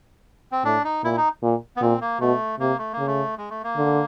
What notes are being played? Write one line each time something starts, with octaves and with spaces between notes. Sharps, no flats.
C4
A2 D4
D#4
A#2 E4
D#4
A#2
B3
A#2 C4
A#3
B2 A3
C3 A#3
A3
A#3
C#3
A3
G#3
A3
A#3
D3